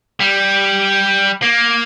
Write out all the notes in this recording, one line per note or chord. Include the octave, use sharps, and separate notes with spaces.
G3
A#3